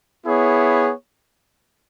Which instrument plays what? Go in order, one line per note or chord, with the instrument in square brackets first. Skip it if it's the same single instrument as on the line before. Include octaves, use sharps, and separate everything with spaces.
[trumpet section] B3 E4 G#4 C#5